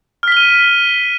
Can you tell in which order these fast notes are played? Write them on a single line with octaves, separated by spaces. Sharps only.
F6 B6 G7 D#7